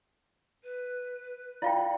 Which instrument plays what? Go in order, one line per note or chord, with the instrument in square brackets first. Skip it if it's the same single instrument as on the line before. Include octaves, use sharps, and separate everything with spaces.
[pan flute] B4
[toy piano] E4 F4 G5 [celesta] D5 F5